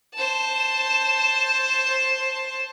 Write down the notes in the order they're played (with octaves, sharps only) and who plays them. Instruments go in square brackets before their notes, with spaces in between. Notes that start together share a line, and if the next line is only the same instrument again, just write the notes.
[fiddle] C5 A5